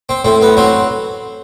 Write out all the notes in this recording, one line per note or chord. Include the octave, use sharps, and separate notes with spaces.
C4
A2 C4
B3
F#3 C4